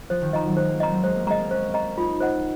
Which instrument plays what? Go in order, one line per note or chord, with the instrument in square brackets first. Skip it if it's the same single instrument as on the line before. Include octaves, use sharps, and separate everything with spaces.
[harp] F3 [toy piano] C5
[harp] D#3
[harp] F3 [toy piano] D#5 A#5
[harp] F#3
[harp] G#3 [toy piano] C5
[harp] A#3
[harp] C4 [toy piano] D#5 A#5
[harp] F#3
[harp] G#3 [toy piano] C5
[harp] A#3
[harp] G#3 [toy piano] D#5 A#5
[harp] A#3
[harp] C#4 [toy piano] C5
[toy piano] D#5 A#5
[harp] D#4 [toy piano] F4
[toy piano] C5 D#5 F#5